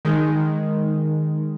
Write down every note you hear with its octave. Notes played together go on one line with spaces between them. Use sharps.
D#3 G#3